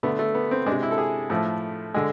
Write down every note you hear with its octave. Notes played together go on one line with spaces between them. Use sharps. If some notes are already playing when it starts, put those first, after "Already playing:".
D3 A3 B3
A3
B3
C4
G#3 D4
C3
E4
A4
G#4
A2 F3 A3
D3 G#3